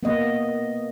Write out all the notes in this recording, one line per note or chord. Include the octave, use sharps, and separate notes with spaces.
A#3 B3 D#5